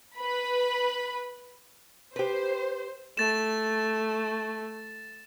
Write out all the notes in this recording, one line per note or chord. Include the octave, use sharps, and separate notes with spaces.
B4 B5
G4 B4 C5
A3 A6 E7